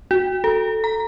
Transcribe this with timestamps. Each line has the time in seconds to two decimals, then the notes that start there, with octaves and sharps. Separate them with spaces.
0.11 F#4
0.44 A4
0.84 A#5